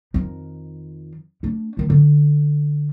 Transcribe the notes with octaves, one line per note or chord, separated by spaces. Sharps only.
F2 D#3
A3 D4
D#3 A3
D3